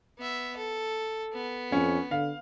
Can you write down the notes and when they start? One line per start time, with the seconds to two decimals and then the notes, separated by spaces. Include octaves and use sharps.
0.18 B3 E5
0.57 A4
1.32 B3
1.72 F2 C#4
2.11 D3 F5